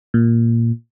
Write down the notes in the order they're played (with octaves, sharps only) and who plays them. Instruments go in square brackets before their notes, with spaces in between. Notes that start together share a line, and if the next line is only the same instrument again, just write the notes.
[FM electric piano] A#2